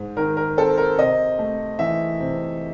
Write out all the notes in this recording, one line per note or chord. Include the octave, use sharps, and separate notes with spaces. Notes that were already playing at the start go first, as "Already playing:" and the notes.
Already playing: G#2 G#3
D#3 A#4
A#4
C4 A4
A#4
C3 D#5
A3
E3 E5
C3